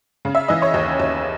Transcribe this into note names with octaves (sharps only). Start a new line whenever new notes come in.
C#3
E5
E3 D#5
C#5
D#2
D#2